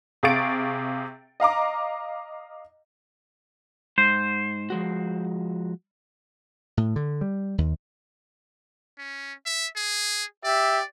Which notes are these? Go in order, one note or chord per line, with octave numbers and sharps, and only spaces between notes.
C3 G#4 F5 C#6 A6 D7
D#5 F5 A#5 D6
G#2 C5
F3 G#3 F#4
A2
D3
G3
D#2
C#4
E5
G#4
G4 D5 E5